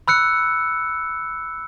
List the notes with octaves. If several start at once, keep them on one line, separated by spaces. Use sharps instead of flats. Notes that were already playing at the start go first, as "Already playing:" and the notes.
B5 E6 F#6 C#7